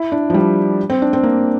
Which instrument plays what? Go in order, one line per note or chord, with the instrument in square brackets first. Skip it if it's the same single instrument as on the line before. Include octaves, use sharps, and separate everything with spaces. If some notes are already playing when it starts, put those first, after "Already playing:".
Already playing: [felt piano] E4
D4
F3
G3
C4
D4
C4
A#3